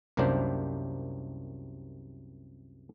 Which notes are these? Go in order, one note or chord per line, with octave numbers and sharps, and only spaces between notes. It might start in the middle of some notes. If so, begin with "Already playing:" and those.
C2 F#2 C3 A#3 D4 C5